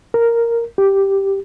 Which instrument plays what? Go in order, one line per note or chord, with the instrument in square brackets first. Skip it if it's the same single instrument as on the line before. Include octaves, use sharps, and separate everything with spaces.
[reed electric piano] A#4
G4